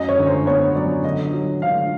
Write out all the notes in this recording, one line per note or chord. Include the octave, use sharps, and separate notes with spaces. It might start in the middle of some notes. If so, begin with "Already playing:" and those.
Already playing: F#2 F#3 D#5
C#5
D3
C5
B3 C#5
F#3 D5
D3 D#5
F#3
D3 F5